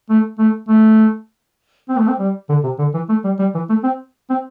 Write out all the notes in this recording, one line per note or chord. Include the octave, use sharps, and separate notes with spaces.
A3
A3
A3
C4
A3
C4
G3
D3
C3
D3
E3
A3
G3
G3
E3
A3
C4
C4